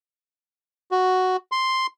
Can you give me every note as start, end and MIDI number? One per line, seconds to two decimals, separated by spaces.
0.91 1.37 66
1.52 1.87 84